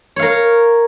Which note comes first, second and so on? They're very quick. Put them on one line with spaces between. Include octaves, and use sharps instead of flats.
C#5 F5 A#4